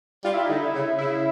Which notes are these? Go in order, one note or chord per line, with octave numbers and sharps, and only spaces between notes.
G3 F4
E4
D3 D#4
E4
C#3
C#3 E4